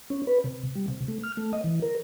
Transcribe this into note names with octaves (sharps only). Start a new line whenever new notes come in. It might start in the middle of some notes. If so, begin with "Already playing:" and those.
C#4
B4
C3
G3
C3
A3
F6
A3
D#5
E3
A#4